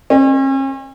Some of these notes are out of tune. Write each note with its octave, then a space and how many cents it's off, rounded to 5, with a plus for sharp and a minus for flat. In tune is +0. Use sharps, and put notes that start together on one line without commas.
C#4 -45